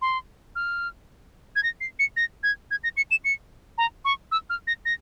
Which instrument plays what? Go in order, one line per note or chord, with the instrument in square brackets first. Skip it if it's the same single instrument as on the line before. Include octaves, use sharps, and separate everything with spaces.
[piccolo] C6
F6
G#6
A#6
C7
C#7
A#6
G#6
G#6
A#6
C#7
E7
C#7
A#5
C#6
E6
F6
A#6
A#6